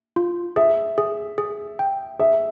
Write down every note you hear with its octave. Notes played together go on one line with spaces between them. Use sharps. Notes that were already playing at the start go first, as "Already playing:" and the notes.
F4
G#4 E5
G#4
G#4
G5
G#4 E5